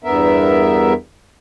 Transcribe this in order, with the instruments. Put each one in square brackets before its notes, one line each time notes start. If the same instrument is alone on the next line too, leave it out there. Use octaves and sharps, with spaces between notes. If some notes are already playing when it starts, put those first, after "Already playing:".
[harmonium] E2 G2 B3 A#4 E5